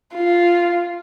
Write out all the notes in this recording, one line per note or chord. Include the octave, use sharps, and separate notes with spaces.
F4